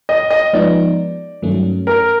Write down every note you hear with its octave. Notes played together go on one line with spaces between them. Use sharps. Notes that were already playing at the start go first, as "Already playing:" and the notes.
D#5
D#5
F3 G#3 B3 D#4 D5
G2 D#3 F#3 A3 C#4
A#4